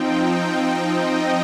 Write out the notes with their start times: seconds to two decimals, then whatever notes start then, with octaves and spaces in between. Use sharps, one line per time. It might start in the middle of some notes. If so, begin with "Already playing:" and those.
Already playing: F3 C4 D#4 G5
0.77 D#5